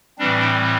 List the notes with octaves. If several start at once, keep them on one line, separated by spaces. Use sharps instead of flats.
A2 E3 G3 C4 D4